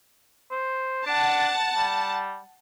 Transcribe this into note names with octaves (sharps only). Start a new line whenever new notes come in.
C5
D4 F#5 A5
G3